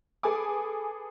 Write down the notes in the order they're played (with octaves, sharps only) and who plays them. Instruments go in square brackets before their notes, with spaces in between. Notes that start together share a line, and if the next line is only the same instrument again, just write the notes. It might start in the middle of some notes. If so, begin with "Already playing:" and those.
[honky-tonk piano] G#4 A4 B4 G#5 D6